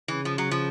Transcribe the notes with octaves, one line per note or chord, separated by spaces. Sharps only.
C#3 E3
F3
F#3
F3